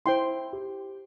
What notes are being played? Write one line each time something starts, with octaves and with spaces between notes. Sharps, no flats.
E4 C5 G5 C6
G4